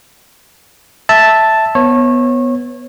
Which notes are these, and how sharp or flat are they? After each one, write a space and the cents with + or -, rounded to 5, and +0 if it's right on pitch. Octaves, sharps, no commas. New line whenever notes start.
E5 -5 A5 +0
B3 +0 C#5 -25